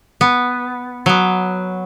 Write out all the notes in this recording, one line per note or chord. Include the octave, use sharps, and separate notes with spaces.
B3
F#3 B3